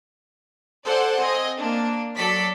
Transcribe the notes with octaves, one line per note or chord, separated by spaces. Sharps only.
A4 C5 D5 F#5 G#5
C4 D#5 G#5
A#3 D4
F#3 A4 D5 B6